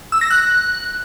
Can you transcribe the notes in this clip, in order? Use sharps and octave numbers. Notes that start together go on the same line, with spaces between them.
E6
A#6
F#6